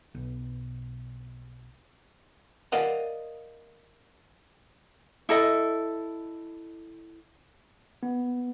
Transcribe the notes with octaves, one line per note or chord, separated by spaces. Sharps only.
B1 B2
A#4 D5 D#5 F5 F#5
E4 A4 D#5
B3